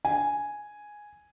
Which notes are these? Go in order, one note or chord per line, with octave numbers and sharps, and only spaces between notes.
G#5